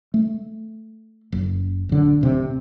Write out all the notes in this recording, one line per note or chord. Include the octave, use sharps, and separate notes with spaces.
A3
F#1
D1 D3
D1 C3